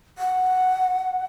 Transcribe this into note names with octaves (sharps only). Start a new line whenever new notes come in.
F#5